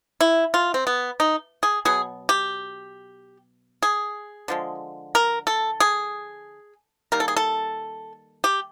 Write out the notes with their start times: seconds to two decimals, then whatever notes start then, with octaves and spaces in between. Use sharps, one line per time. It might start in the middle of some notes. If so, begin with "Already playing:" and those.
0.21 E4
0.54 F4
0.74 C4
0.87 B3
1.20 D#4
1.63 G#4
1.85 B2 F#3 B3 G#4
2.29 G4
3.82 G#4
4.48 D3 F3 G#3
5.15 A#4
5.47 A4
5.80 G#4
7.12 D#3 G3 A#3 A#4
7.20 A4
7.28 G#4
7.36 A4
8.44 G4